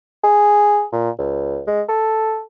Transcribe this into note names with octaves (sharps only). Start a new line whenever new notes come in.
G#4
A#2
C#2
G#3
A4